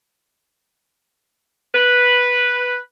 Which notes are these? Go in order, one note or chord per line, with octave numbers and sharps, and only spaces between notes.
B4